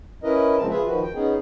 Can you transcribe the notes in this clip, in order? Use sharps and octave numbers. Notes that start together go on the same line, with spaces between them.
C#4 E4 A#4 B4 D#5
A#2 C#3 F3 G#3 C4 A5
F4 G#4 B4 E5
D#3 F3 F#4 B4
G5
B3 C#4 D#4 G#4